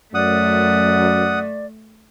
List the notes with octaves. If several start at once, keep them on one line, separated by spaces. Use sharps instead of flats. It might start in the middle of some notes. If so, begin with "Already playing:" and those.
F#2 A3 D5 F#5 D#6